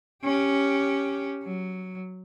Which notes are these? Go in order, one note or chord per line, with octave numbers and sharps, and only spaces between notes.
C#4 G4
F#3